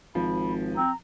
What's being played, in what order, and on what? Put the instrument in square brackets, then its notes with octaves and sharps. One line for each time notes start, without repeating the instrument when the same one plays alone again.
[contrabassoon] G#1 [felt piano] F3 [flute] B5
[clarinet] C4 [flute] A#5